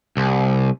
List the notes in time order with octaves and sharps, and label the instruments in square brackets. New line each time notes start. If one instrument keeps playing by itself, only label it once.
[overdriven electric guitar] C2